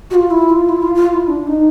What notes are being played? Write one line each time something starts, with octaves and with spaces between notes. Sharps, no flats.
F#4
F4
E4
F4
E4
F4
F4
F4
E4
D4
D#4